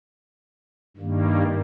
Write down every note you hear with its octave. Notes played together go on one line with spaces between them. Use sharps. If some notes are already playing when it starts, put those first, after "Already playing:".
G2 D#3 G3 A#3